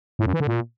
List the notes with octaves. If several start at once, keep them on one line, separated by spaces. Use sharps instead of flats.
A2
F#2
E3
D3
A#2